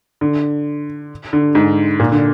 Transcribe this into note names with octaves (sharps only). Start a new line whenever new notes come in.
D3
D3
G#2
A#2
D3